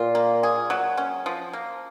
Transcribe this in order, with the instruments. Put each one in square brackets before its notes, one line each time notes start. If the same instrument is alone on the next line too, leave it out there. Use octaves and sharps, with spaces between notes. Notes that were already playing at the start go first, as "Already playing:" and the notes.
Already playing: [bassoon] A#2 [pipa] F4
[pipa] A#3
G#4
F#3
C#4
F3
A#3